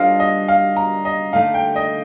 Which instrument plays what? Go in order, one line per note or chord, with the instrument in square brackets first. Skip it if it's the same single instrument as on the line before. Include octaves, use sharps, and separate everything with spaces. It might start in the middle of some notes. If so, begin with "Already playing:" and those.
Already playing: [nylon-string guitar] G3 D4 F4 A4 C5 [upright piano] D#5 F5
[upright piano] D#5
F5
A#5
D#5
[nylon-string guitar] D3 A3 D#4 [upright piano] F5
[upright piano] G5
D#5